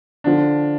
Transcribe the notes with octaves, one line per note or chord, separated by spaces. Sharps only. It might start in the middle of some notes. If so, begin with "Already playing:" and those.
D3 F3 D4